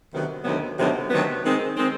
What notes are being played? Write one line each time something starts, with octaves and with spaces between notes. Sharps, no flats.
D2 C3 D#3 F#3 B3
D2 C3 D#3 F#3 B3
D2 C3 D#3 F#3 B3
D2 C3 D#3 F#3 B3
D#3 G#3 C4
D#3 G#3 C4